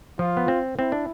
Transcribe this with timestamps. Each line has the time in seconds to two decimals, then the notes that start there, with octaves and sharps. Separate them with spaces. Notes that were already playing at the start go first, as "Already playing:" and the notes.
0.19 F3 F4
0.37 B3
0.48 C4
0.78 C4 E4
0.92 D4